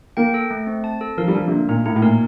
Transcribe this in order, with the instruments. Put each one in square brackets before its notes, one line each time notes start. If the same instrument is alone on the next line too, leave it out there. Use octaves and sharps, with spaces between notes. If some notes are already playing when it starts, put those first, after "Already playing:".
[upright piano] A#3 [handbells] G5
[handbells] A4
A3
C4
A5
A4
[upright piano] F3 [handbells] A#4
[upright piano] G3
[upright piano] F3 [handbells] D4
[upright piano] C3
[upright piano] D3 [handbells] A#3
[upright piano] A#2 [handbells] D#4
[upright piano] A2 [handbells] D#4
[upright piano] A2
[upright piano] A#2 [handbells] A#4